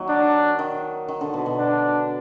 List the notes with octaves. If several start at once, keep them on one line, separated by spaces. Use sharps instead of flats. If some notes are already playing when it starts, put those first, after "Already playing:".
Already playing: D#3 F#3 A#3
D4
D#3
D#3
D3
B2
B2
D4